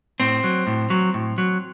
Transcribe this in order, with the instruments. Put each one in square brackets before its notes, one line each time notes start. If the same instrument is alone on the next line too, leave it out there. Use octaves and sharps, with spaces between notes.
[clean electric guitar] A2 C4
F#3
A2
F#3
A2
F#3